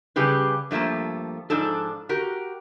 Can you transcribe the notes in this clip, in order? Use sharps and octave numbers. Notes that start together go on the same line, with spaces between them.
C#3 G3 G4 G#4 B4
G2 F3 A3 A#3 A5
G#2 F3 D4 A4
F#4 G4 A#4